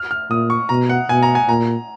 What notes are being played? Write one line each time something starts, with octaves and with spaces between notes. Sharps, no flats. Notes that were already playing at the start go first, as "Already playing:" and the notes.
Already playing: F6
F6
A#2 D#6
C#6
B2 A#5
F#5
B2 G#5
A#5
G#5
A#2 A#5